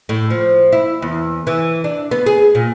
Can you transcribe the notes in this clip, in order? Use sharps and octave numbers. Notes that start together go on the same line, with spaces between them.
A2
F3
E4
E2
E3
D4
B3
G#4
A#2